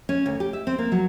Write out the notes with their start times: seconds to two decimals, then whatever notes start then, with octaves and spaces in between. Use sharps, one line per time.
0.09 C#4
0.26 D2
0.40 G4
0.53 E5
0.67 C4
0.78 A#3
0.92 F#3